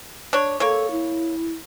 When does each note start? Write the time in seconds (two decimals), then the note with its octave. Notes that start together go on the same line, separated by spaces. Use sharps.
0.33 D4 C#5
0.60 A#3 A4 C#5
0.91 E4